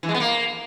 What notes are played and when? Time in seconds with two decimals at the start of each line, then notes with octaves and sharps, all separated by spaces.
0.03 E3
0.09 G#3
0.14 B3
0.20 A#3